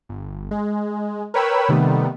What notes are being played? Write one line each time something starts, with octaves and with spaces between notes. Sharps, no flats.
G1
G#3
A#4 B4 C#5 G5 B5 E6
C3 D#3 G3 A3 B3